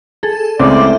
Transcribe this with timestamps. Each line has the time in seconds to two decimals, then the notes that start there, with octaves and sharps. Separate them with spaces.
0.23 G#4 A4
0.59 C#2 A2 C#3 C4 D5 D6